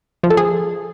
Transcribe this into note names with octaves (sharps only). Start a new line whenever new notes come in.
F3
A4
G#4